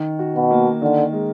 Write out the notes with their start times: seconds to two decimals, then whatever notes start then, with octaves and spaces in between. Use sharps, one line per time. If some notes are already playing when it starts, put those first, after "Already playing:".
Already playing: D#3
0.19 F#4
0.35 B2
0.51 A#3
0.82 D3 D#3
1.13 G#3